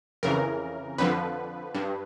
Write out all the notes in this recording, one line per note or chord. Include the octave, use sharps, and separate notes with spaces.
F2 C#3 E3 A#4
F2 D3 F3 B4
G2